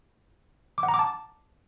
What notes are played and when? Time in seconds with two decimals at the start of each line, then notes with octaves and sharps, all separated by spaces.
0.78 D6
0.83 F#5
0.88 A#5
0.94 D6
0.99 A5